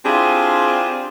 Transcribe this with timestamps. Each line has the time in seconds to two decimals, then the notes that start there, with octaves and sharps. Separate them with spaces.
0.05 C4 D4 E4 F4 G4 G#4